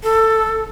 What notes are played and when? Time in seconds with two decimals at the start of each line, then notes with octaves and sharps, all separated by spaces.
0.03 A4